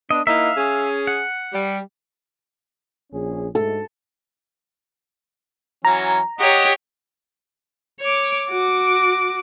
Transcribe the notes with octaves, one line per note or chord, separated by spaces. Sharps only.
B3 D4 D#5
A#3 D#4 E4 E5 F5
C#4 G#4
F#5
G3
A#1 C#4 G#4
G#2 A3 A4
E3 F#3 C#4 A#5
G4 C#5 D#5 F#5
C#5 D6
F#4 D6